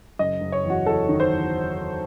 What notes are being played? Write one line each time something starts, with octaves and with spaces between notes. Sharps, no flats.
F#1 D#5
F#1
C#5
E2
F#4
E2 A4
D#3
C5
E2